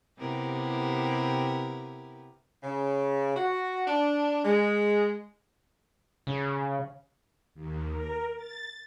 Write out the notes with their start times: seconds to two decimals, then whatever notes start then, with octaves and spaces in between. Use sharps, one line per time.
0.18 C3 B3 E4 G4 A#4
2.63 C#3
3.36 F#4
3.87 D4
4.44 G#3
6.27 C#3
7.54 D#2
7.91 A#4
8.36 A6